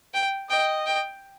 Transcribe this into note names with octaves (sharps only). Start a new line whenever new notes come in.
G5
D#5 G5
G5